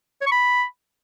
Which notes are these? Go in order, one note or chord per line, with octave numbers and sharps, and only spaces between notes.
C#5
C#6
B5